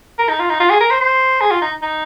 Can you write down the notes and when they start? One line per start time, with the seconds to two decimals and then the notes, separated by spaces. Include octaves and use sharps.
0.19 A#4
0.29 D#4
0.40 F4
0.50 D#4
0.60 F4
0.70 G#4
0.81 A#4
0.91 C5
1.01 C5
1.41 G#4
1.51 F4
1.62 D#4
1.82 D#4